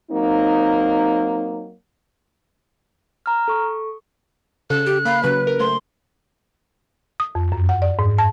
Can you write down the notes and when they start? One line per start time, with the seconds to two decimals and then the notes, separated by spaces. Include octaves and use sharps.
0.10 F#3 A#3 C4 D#4
3.26 A#5 F6
3.48 A4 C#6
4.70 C#3 A4 F#6
4.86 G4
5.05 A#3 F5 B5
5.23 C#3 F#3 B4
5.47 A#4
5.60 A3 C5 C6
7.20 D#6
7.35 F2
7.52 F#2
7.69 F#5
7.82 D5
7.99 G#2
8.18 A5